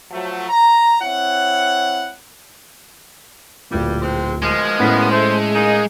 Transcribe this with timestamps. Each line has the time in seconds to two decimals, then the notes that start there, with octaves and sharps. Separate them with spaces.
0.11 F3 F#3 A3
0.49 A#5
1.02 C4 E4 C#5 F#5
3.71 D1 G2 A#2 G3
4.02 D#2 G#3 C4
4.42 B2 D#3 F3 G#3
4.80 A2 B3 C#4 B6
5.11 A3 C5
5.55 A#3 D#4 G#4